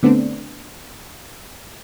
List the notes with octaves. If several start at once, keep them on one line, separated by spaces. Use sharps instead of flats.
D3 A3 B3 C4 D4